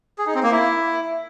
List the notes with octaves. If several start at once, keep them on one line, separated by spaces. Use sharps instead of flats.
G#4
D#4
C4
A#3
E4